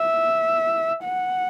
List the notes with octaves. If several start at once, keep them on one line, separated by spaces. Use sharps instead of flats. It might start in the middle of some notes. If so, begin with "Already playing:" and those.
Already playing: E5
F#5